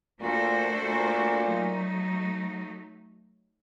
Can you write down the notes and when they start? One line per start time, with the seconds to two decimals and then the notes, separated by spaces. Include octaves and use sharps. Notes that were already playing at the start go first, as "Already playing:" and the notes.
0.21 A#2 A3 D4 F#4 A4 C5
0.83 A#2
1.46 F#3 A3 D#4